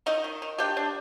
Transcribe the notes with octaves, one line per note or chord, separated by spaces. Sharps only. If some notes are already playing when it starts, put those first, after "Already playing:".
D#3 D#4 D#5
D#3
D#3
D4 G4 G5
D4